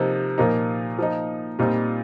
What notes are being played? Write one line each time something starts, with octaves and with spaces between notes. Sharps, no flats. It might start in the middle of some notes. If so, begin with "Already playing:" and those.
Already playing: C3 F3 A#3 D#4
A#2 F3 A#3 D#4
F3 D#4
A#2 G3 C4 D#4